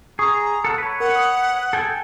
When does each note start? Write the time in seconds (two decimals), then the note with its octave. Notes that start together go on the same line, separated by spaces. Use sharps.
0.19 G#4 A#5 C#6 D#6
0.64 A4 F#5
0.78 B4 C#5
1.00 A#4 F#5
1.16 D#6
1.73 A4 G5 G#5